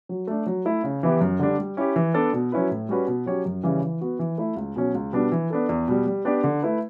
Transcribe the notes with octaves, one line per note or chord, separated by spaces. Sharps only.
F#3
A3 D4
F#3
A3 E4
C#3
E3 B3 E4 G4
F#2
D3 G3 D4
G3
C#4 E4 G4
E3
B3 D4 A4 D5
B2
F#3 C#4 E4 B4
A2
G3 C#4 F#4 B4
B2
F#3 C#4 G4 C#5
F#2
C#3 E3 G3 C#4
E3
B3 F#4
E3
A3 E4
C#2
B2 F#3 C#4
C#2
B2 G3 B3 D4
E3
B3 D4 A4
E2
B2 G3
G3
B3 D4 G4 D5
D3
A3 E4 B4